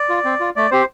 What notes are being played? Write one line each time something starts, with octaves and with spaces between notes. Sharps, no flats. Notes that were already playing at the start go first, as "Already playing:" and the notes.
Already playing: D5
F4
C4
F4
A3 D5
C4 G4 C5